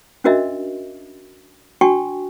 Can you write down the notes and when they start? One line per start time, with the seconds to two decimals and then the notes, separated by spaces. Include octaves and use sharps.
0.24 C#4 D4 F#4 A#4 D#5 E5
1.81 D4 F#4 G5 G#5 C#6